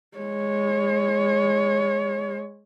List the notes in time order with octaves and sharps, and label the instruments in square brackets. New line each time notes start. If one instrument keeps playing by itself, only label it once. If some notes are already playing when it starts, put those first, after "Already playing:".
[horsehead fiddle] G#3 C#5